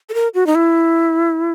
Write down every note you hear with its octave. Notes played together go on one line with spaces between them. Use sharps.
A4
A#4
F#4
D#4
E4